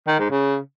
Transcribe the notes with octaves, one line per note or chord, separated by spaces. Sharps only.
D#3
G#2
C#3